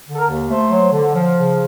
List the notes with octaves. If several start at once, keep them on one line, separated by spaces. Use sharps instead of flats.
D3 A4
A#4
D#2
A3 C5
F#3
D3
F3
C#3